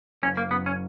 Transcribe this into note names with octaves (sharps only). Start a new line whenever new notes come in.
F#1 C#4
A#3
F#2 B3
C#4